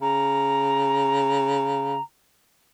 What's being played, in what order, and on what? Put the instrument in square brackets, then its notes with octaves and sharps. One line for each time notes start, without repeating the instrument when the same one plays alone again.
[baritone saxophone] C#3 [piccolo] A#5